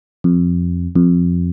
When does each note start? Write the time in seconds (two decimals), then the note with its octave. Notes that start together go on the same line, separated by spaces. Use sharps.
0.24 F2
0.96 F2